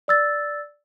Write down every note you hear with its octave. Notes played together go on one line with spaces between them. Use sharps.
D5 E6 A6